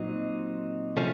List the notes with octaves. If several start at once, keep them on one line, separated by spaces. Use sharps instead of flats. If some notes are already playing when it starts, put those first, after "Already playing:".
Already playing: A#2 F#3 C4 D#4
C3 F3 A3 C#4